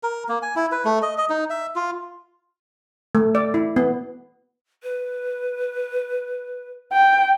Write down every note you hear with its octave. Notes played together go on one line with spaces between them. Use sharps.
A#4
A#3
G#5
E4
B4
A3
D#5
D#5
D#4
E5
F4
A3
D5
E4
B3
B4
G5